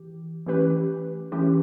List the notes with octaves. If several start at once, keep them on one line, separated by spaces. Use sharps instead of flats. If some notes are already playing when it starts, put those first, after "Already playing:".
Already playing: E3 G4
E3 A3 C#4 G4 B4
E3 A3 C#4 G4 B4